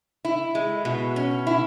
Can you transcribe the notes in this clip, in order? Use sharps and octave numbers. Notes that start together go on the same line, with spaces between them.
E4
G#3
B2
C#4
E4